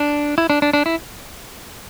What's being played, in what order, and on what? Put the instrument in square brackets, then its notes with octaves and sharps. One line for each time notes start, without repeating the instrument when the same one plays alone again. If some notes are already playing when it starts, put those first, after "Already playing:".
Already playing: [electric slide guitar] D4
E4
D4
D4
D4
E4